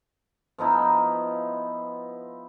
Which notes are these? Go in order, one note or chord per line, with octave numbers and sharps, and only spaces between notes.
F3 B3 D#4 E4